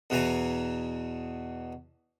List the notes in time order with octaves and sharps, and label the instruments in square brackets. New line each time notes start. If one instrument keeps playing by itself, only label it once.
[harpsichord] E2 B2 E3 G#5 A#5